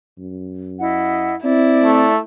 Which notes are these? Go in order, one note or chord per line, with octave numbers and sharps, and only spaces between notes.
F#2
E4 D#5 F#5
C4 E4 D5
A3